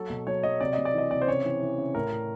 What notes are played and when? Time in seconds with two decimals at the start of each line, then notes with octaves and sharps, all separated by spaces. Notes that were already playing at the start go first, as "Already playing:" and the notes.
Already playing: F#3 A4
0.10 B2
0.27 F#3 C#5
0.43 F#3 D#5
0.61 C3 D5
0.73 C3 D#5
0.85 D5
0.94 E3 D#5
1.11 C3 D5
1.22 C5
1.27 C#3 C#5
1.45 E3
1.62 E3
1.78 C#3
1.95 A2 A#4
2.11 A2